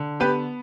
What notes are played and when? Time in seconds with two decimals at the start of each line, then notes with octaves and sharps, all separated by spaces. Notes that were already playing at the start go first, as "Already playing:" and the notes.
Already playing: D3
0.20 B3 G4 B4